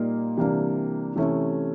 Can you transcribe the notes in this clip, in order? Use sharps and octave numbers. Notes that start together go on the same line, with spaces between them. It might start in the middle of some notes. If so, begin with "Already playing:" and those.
Already playing: A#2 G3 A#3 D#4
C3 E3 G3 A#3 D4
C3 E3 A3 C#4 E4